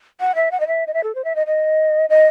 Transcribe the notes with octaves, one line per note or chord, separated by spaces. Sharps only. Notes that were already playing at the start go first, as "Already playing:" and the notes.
F#5
E5
F#5
D#5
E5
D#5
E5
A4
C5
E5
D#5
D#5
D#5